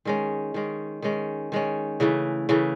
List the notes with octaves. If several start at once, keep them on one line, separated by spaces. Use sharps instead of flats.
D#3 G#3 C#4
D#3 G#3 C#4
D#3 G#3 C#4
D#3 G#3 C#4
C#3 E3 A3
C#3 E3 A3